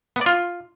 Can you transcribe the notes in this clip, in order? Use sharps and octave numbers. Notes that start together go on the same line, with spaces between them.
B3
D5
F4